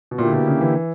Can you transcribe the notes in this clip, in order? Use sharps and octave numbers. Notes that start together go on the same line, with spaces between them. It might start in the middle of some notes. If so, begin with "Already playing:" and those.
B2
A#2 D3 A#3 E4 G4
B2
C#3
E3